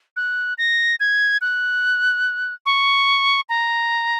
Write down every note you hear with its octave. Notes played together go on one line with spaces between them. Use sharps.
F#6
A#6
G#6
F#6
C#6
A#5